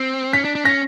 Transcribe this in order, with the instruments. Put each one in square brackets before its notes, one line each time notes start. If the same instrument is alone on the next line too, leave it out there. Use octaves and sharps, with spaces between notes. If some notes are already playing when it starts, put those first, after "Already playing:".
Already playing: [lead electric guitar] C4 [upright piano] C7
[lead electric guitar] C#4 [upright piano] B6
[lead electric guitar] D4
D4
[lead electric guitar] C#4 [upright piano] A#6